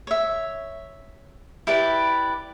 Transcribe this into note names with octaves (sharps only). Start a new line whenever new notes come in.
C#5 E5
E4 G4 B4 D5